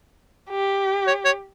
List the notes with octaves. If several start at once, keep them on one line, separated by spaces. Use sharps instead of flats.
G4
C#5
C#5